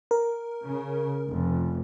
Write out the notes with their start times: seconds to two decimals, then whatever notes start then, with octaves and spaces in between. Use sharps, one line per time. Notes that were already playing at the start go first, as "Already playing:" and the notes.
0.11 A#4
0.63 C#3
1.29 F1